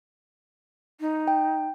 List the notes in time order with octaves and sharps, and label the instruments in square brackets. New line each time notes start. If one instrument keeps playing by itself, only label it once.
[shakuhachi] D#4
[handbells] G5